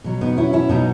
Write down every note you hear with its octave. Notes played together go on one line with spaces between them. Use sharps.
B2 F#3
B3 D#4
C#4 E4
C#4 E4
B2 F#3 B3 D#4